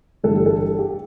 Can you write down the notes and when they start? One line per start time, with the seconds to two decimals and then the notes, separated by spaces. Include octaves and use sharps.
0.23 G1 G2 E3 G3 A4
0.35 G4
0.46 A4
0.79 G4